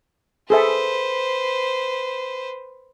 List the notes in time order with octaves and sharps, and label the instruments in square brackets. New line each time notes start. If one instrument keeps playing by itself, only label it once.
[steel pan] G#4 A4 E5 [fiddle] B4 C5